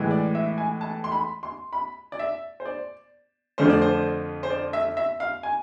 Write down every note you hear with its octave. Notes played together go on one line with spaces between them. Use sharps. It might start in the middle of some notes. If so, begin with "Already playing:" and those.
Already playing: A2 E3 G#3
D5
E5
G#5
A5
C6
B5
C6
B5
D5
E5
C5
D5
F2 D3 F3 A3 D4 C5
D5
C5
C5
D5
E5
E5
F5
G#5